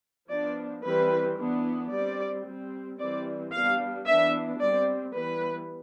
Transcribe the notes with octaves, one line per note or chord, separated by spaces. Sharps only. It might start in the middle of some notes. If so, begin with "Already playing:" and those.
F3 B3 D4 D5
E3 G3 C4 B4
E3 B3 D4
G3 C4 D5
G3 C4
E3 G3 C4 D5
G3 B3 D4 F5
E3 B3 D4 E5
G3 C4 D5
E3 G3 B3 B4